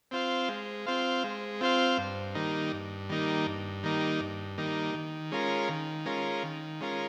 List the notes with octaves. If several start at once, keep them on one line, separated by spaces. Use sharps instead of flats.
C4 F4 C5 F5
G#3
C4 F4 C5 F5
G#3
C4 F4 C5 F5
G2
D#3 G3 A#3 D#4
G2
D#3 G3 A#3 D#4
G2
D#3 G3 A#3 D#4
G2
D#3 G3 A#3 D#4
D#3
G#3 C#4 F4 A#4
D#3
G#3 C#4 F4 A#4
D#3
G#3 C#4 F4 A#4